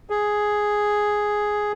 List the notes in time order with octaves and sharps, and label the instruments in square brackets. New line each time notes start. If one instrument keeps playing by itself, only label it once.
[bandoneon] G#4